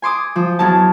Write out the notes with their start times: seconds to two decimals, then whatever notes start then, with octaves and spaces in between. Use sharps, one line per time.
0.02 G#5 C6 D6 D#6
0.36 F3
0.59 E2 F#3 A5